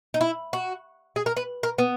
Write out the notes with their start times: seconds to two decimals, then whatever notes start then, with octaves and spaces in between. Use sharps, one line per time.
0.14 D#4
0.21 E4
0.53 F#4
1.16 G#4
1.26 A#4
1.37 B4
1.63 A#4
1.78 B3